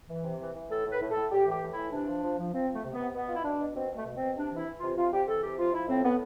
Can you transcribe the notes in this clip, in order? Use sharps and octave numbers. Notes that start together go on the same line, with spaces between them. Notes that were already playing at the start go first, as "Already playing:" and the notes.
E3
C3
E3
E3
A2 A4
A2
B4
A2
A4
A2
A2 G4
E3
G4
A2
E4
E3
C3 D4
F3
F3
F3
F3 C4
F3
A3
C3
B3
C3
B2 B3
B2 F4
E4
B2 D4
B2
B2 C4
B2
A3
B2
B2 C4
C3 D4
E3 E4
E3
F4
C3
C3 F4
C3 G4
E3 A4
C3 G4
F3 F4
F3 E4
A2 C4
A2 B3